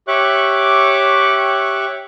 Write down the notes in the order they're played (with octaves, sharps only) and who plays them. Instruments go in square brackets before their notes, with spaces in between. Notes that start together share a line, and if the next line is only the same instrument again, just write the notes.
[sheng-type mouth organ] G4 C#5 E5 C#6 D6 F#6